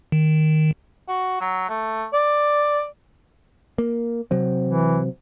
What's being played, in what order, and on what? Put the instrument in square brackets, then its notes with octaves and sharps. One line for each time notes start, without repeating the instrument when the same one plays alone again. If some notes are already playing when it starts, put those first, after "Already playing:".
[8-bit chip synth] D#3
[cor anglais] F#4
F#3
A3
D5
[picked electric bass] A#3
C3 F#3 C4
[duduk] E3